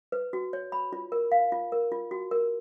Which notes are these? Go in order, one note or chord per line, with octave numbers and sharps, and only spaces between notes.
B4
F#4
C#5
B5
F4
A#4
F5
F4
A#4
F4
F#4
A#4